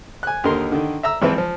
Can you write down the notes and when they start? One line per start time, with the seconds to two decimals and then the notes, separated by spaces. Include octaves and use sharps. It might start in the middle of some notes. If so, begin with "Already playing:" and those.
0.23 G#5 F#6
0.44 D#2 D3 D#4 A#4 C6
0.72 D3 D#3
1.03 E5 A#5 E6
1.22 G#1 E3 F3 C4 B4 E5
1.38 F3